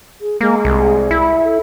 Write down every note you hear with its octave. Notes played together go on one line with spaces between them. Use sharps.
G#4
G#3 A#3 G#4
C2
E4
A4